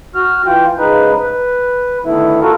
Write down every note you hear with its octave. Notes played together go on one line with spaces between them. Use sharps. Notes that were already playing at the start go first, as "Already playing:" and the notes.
F#4 F6
E3 F4 G5
G#2 C#3 D#4 B4
B4
D3 D#3 A3 B3 E4
F4 F#4 A4 A#4